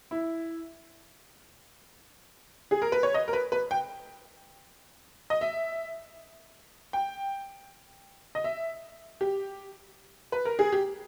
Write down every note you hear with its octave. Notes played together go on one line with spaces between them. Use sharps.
E4
G#4
A#4
B4
C#5
D#5
A#4
B4
B4
G5
D#5
E5
G5
D#5
E5
G4
B4
A#4
G#4
G4